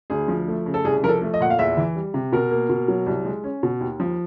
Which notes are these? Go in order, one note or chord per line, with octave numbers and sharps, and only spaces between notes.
D2 G#4
F3
A3
C#3
A4
C2 G#4
F3 A#4
A4
A3
D#5
A#2 F#5
F5
E2 E5
E3
G3
C3
B2 A#4
A#3
B2
F#3
C2
G#3
C#4
B2
D#2
F3